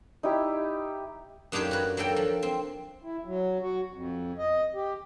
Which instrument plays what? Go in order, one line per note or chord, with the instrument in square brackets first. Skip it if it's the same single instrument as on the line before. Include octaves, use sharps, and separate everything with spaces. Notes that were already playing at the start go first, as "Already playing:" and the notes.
[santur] D#4 E4 G4 E5
[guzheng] F#2 A#3 D4 D#4 G4 C#5
F#4 B4
F#3 A#3 A4 G5
F3
C4
[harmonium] E4
F#3
F#4
F2
D#5
G4